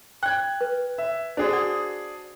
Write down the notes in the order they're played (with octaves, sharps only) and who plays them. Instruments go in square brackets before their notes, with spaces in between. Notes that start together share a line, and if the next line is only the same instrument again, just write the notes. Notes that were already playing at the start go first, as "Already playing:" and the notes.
[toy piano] G5 [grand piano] F#6 G#6
[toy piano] B4
[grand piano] E5
[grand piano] D4 G#4 [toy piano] F#4 C5
[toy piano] D5 F#5 D#6